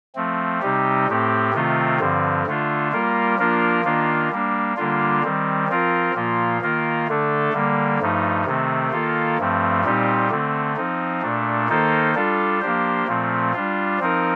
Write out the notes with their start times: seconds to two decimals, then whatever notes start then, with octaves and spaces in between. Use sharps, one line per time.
0.15 F3 A3 C4
0.61 C3 G3 C4 D#4 G4
1.08 A2 A3 C4 G4
1.53 C3 D#3 A3 C4 F4
1.99 G2 D3 F3 C4
2.46 D3 A3 D4 F4
2.91 G3 A#3 F4 A#4
3.38 F3 A#3 D4 F4 A#4
3.83 D#3 A#3 D4 F4
4.30 G3 A#3 D4
4.76 D3 G3 A#3 D4 F4
5.23 D#3 G3 C4
5.68 F3 C4 F4 A#4
6.14 A#2 F3 A#3 F4
6.61 D#3 A#3 F4 A#4
7.07 D3 A3 D4 A4
7.53 D3 G3 A#3
7.99 G2 F3 A3 D#4
8.45 C3 D#3 A3 C4
8.91 D#3 A#3 F4 A4
9.38 G2 F3 A3 C4
9.84 A#2 G3 C4 D#4 G4
10.29 D3 A3 C4
10.76 F3 C4 D#4
11.22 A#2 A3 D4
11.68 D#3 A#3 D#4 A4 C5
12.15 G3 D4 F4 A4
12.60 F3 A#3 D4 G4 C5
13.07 A#2 F3 A3 C4
13.53 G3 D4 F4
13.99 F3 C4 D#4 A#4